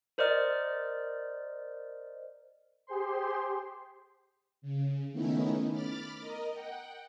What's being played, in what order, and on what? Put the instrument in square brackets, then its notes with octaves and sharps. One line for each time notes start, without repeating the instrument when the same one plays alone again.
[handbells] A#4 C5 D5 D#5 F6
[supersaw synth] G4 G#4 C5 C6
[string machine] C#3
D#3 A3 B3 C#4 D#4 E4
B5 D6 F6 A6
A#4 D#5
F#5 G5